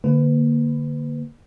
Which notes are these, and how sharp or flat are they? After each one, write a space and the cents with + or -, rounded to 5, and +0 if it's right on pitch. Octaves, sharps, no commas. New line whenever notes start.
D3 +0 A#3 +0 B4 +25